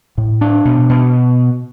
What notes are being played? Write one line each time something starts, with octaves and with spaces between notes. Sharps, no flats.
A2
D4
B2
B2